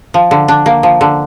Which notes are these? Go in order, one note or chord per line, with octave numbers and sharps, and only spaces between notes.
F3
D3
D4
A#3
F3
D3